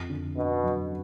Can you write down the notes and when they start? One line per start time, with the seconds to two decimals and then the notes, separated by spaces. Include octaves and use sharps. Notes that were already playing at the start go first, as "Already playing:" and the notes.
Already playing: F2 F4
0.10 D3
0.36 B2 D4
0.64 F#3